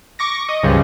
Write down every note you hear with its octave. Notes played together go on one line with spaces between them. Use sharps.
C#6 D6 A#6
D#5
C#2 G2 C#3 F3 G3